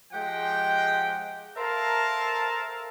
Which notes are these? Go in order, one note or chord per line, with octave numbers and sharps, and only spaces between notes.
F3 G#3 G4 F#5 G5
A4 A#4 C5 E5 F5 A5